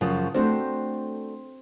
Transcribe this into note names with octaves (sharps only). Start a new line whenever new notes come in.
F#2 C#3 F3
A3 C4 D4 F#4 C5